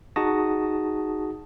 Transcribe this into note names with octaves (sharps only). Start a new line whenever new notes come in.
D#4 F#4 G#4 A5 D#6 A#6